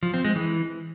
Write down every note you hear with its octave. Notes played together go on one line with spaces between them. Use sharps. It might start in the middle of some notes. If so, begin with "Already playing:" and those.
F3
C4
G#3
E3